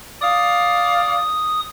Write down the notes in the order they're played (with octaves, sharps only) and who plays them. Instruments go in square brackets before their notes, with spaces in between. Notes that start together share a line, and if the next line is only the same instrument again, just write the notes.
[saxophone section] D5 F5 [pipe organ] D#6